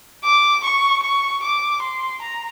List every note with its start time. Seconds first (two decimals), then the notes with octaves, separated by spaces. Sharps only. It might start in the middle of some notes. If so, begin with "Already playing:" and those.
0.24 D6
0.63 C#6
1.03 C#6
1.43 D6
1.82 C6
2.21 A#5